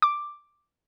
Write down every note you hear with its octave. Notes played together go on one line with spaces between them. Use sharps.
D6